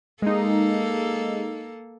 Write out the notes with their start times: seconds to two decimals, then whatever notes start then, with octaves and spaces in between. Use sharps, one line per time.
0.22 G#3 A#3 D#4 A4